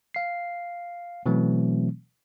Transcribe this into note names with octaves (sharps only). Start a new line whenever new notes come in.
F5 C7
B2 E3 F#3 A3 C4